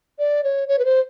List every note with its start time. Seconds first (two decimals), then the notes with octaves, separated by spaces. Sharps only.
0.19 D5
0.44 C#5
0.68 C#5
0.79 B4
0.85 C5